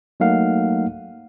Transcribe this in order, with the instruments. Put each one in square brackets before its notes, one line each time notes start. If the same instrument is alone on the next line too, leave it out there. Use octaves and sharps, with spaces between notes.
[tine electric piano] F#3 A3 A#3 D#4 F5 F#5